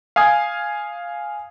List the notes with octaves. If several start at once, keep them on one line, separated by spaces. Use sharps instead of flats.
F5 G#5 D#6 G#6